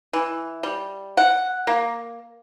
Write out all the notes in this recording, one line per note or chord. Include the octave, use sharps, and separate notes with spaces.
E3
G3
F#5
A#3